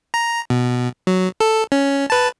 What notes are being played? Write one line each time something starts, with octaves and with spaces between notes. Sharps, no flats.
A#5
B2
F#3
A4
C#4
B4 A5